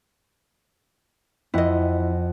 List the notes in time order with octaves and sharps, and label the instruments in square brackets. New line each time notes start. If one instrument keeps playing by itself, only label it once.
[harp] F2 F#5 [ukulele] E4 D#5